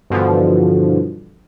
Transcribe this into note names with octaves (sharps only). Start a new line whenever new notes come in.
G2 B2 D3 E3 F3